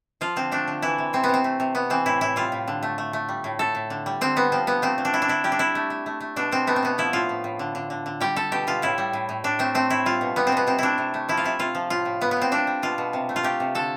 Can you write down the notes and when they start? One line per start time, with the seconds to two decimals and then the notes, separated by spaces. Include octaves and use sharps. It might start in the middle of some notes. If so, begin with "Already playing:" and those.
0.21 F3 F4
0.36 D3 C4
0.52 A3 D4
0.68 D3
0.82 E3 E4
0.98 C3
1.13 C3 C4
1.24 B3
1.29 C3 C4
1.44 A3
1.60 C3
1.75 C3 B3
1.90 E3 C4
2.06 A2 E4
2.21 A2 E4
2.36 G3 F4
2.52 A2
2.68 D3
2.83 A3
2.98 A3
3.13 A3
3.29 G3
3.44 A2
3.59 A2 A4
3.75 A2
3.90 D3
4.06 G3
4.21 D3 C4
4.36 G3 B3
4.52 F3 C4
4.67 D3 B3
4.82 A3 C4
4.98 D3
5.05 D4
5.13 D3 E4
5.22 D4
5.28 D3 E4
5.44 G3 G4
5.52 D4
5.59 G3 E4
5.75 A3
5.90 A3
6.06 A3
6.21 A3
6.36 B2 D4
6.52 B2 C4
6.67 A3 B3
6.76 C4
6.83 B2 B3
6.98 F3 E4
7.13 A2 F4
7.29 A2
7.44 A2
7.59 D3
7.75 D3
7.90 D3
8.06 D3
8.21 G3 G4
8.36 G3 A4
8.52 B2 G4
8.67 B2 F4
8.82 A2 E4
8.98 G3
9.13 A2
9.29 A2
9.44 A2 D4
9.59 A3 C4
9.75 A3 C4
9.90 A2 E4
10.06 G3 F4
10.21 B2
10.36 G3 B3
10.47 C4
10.52 B2 B3
10.67 C3 C4
10.79 A3 D4 E4
10.98 C3
11.14 A3
11.29 F3 E4
11.37 F4
11.44 C3 E4
11.59 C3 F4
11.75 F3
11.90 A2 F4
12.05 A2
12.21 A2 B3
12.31 B3
12.37 A2 C4
12.52 G3 D4
12.67 G3
12.82 B2 F4
12.98 B2
13.13 C3
13.29 A3
13.36 F4
13.43 A3 G4
13.60 C3
13.75 D3 A4